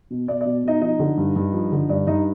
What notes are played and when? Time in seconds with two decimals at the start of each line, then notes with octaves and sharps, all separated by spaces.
0.10 B2
0.28 B2 D5
0.41 B2 D5
0.64 B2 D#4 D#5
0.81 F3 D#4 D#5
0.99 D3
1.17 G2
1.36 G2
1.53 F3
1.72 D3
1.89 G2 D5
2.07 G2 D#4 D#5